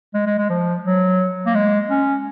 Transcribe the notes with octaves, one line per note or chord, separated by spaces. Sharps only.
G#3
G#3
G#3
F3
F#3
A#3
G#3
C#4